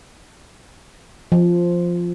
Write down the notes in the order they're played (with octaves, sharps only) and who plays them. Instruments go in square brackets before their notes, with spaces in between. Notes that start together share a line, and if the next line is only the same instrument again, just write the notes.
[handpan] F3